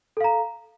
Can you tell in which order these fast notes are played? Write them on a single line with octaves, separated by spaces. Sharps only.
A4 F5 A#5